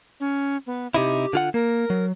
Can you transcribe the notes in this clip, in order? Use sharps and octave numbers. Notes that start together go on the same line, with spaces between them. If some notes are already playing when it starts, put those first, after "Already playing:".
C#4
B3
C3 D#4 E4 G4
D3 F4 F#5
A#3 A#4
F#3